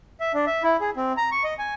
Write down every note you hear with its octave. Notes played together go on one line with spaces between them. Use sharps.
E5
D4
E5
E4
G#4
C4
A#5
C#6
D#5
G#5